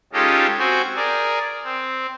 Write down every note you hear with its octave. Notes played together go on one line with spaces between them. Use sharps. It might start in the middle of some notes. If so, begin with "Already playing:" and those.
G#3 C#4 D#4 F4 G4 A4
C4 F#4 G5 G#5
G#4 A#4 D5
C4